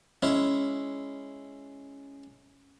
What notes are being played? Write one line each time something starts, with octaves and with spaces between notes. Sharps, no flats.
G#3 C#4 E4